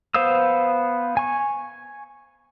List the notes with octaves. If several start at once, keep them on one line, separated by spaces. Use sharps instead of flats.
B3 C5 F5 D#6 E6
G#5 C#6